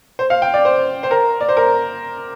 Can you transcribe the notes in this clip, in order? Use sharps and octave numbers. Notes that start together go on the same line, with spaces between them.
C5
F5
G5
D5
C5
C5
A#4
D5
C5
A#4